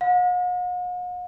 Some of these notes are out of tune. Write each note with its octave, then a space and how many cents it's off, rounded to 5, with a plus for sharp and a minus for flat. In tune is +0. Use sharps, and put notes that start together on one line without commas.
F#5 -45